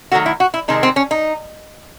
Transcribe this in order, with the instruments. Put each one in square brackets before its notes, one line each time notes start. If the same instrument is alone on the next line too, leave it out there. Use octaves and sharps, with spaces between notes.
[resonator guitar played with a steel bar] D#3 F#3 A3 F#4
E4
F#4
E4
C3 D#3 G#3 D#4
C4
C#4
D#4